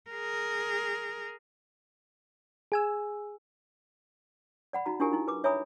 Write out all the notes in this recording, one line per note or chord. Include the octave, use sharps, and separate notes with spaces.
G#4 A#4
G#4 G#5 E6
D5 F#5 B5
D#4 F#4 A#5
D4 E4 F4 G4 A#4 G#5
D#4 E4
B4 D6
C#5 E5 G#5 A#5 B5 D#6